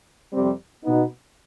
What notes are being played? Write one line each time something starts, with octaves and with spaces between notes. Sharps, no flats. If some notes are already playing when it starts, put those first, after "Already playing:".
F2 C3 G3 C4
B2 B3 D#4